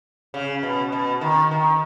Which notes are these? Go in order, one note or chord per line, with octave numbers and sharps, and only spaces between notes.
C#3
B2
B2
D#3
D#3